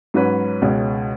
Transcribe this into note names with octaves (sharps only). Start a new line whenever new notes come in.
G#2 F#3 C#4 F#4 B4
C#2 B2 G#3 C#4